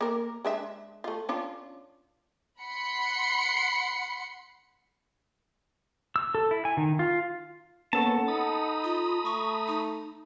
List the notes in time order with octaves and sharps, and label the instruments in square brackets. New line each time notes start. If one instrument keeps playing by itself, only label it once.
[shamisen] A#3 A#4
G#3 D4 E5
A3 F4
C#4 D4 F4
[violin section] F#5 B5 C6 C7 C#7
[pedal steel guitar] E6
A4
E4
G#5
D#3
F4
[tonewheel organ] A#3 B3 C#4 [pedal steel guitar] A4 A5 [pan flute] F#5
[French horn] D#4 [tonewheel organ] A#5 B5 D#6
[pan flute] F4
[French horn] A3 [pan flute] C#6
[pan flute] D#4